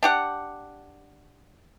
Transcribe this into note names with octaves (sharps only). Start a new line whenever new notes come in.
D4 G4 F#5